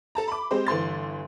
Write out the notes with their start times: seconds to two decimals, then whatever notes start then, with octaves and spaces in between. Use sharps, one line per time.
0.15 A4 A5 A#5
0.28 B5 D6
0.51 G#3 C4 G4 C5
0.67 G1 E3 C6 A6